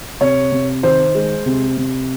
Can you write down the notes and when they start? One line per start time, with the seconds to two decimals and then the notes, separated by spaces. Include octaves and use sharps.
0.21 C3 C#5
0.52 C3
0.83 D#3 C5
1.15 G#3
1.46 C3
1.77 C3